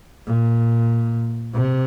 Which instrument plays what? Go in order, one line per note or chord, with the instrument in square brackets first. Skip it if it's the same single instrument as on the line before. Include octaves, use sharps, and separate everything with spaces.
[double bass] A#2
C3